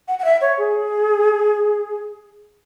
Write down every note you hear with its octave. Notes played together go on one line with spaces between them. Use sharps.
F#5
F#5
E5
C#5
G#4